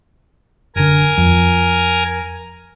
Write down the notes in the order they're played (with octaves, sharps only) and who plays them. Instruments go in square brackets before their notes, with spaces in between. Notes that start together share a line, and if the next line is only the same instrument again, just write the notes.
[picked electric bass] F#1 D3 [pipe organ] A#4 G#5 A#5
[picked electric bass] F2